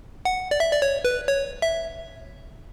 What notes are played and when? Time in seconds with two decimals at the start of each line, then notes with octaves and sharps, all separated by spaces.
0.25 F#5
0.51 D5
0.60 E5
0.73 D5
0.82 C#5
1.05 B4
1.28 C#5
1.62 E5